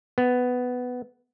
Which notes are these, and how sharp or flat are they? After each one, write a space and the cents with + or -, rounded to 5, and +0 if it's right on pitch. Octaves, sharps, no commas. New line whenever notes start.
B3 +10